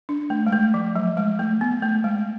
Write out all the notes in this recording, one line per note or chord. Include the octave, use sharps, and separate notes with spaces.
D4
A3
G#3
A3
F3
F#3
G#3
A3
B3
A3
G#3